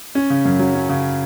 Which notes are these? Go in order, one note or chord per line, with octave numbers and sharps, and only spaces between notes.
C#4
C#3
F#2
F#3
C#4
C#3